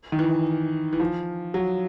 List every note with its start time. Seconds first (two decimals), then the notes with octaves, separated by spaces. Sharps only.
0.12 D#3
0.19 E3
0.93 E3
1.00 F3
1.54 F#3